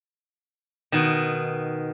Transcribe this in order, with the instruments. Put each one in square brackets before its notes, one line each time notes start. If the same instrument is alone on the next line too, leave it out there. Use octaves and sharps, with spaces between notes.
[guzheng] B2 D#3